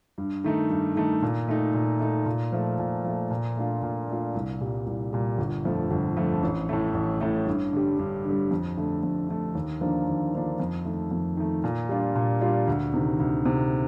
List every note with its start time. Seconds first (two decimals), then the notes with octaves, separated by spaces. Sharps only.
0.18 G2
0.44 D#3 A3 D#4
0.70 G2
0.96 D#3 A3 D#4
1.22 A#2
1.48 A3 D#4
1.74 A#2
2.00 A3 D#4
2.26 A#2
2.52 F3 A3
2.79 A#2
3.04 F3 A3
3.31 A#2
3.56 A3 D4 F4
3.83 A#2
4.08 A3 D4 F4
4.35 C2
4.60 A#2 G3
4.87 C2
5.13 A#2 G3
5.38 G1
5.65 F2 D3 F3 A3
5.90 G1
6.17 F2 D3 F3 A3
6.43 A1
6.69 A2 A3
6.94 A1
7.21 A2 A3
7.46 G2
7.73 D3 G3
7.99 G2
8.26 D3 G3
8.51 F2
8.77 D3 A3
9.03 F2
9.29 D3 A3
9.55 D#2
9.81 D3 F3 A#3 D4
10.07 D#2
10.33 D3 F3 A#3 D4
10.59 F2
10.85 D#3 A3
11.11 F2
11.37 D#3 A3
11.64 A#2
11.89 G3 D4 F4
12.15 A#2
12.41 G3 D4 F4
12.67 D2
12.94 C3 D#3
13.20 D2
13.46 C3 D#3